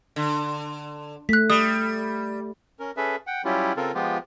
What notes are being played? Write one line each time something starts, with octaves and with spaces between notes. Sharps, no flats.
D3
A3 F#6 B6
G3 D#6
C#4 A#4
C#4 G#4 A4 B4 E5
F#5 G5
F#3 G3 C#4 E4 F4 G4
C#3 C4 F4 A4 A#4
F3 G#3 B3 F4 G4